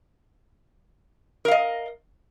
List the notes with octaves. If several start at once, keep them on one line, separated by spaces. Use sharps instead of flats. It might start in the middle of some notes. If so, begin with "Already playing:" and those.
A#4 D#5 F5